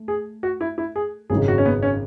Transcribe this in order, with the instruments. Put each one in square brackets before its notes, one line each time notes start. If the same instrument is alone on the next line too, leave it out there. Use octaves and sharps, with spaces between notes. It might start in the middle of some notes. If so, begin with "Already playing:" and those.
Already playing: [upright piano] A3
[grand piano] G#4
F#4
E4
E4
G#4
[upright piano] G#1 F#2 C#3 G#3 D#4 [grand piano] G#4
[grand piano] F#4
C#4
B3
C#4